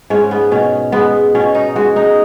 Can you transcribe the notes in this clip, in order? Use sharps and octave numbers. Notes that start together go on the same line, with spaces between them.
G#2 C#4
B3
B2 C#4
G#3 B3
B2 C#4
D#4
G#3 F#4
D#4